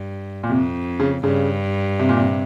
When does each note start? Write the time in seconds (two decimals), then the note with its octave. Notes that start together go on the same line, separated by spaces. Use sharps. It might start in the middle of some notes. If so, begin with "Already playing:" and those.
Already playing: G2
0.43 A#2
0.49 F2 C3
1.00 C#3
1.24 G2 C#3
1.99 C3
2.09 A#2
2.17 C3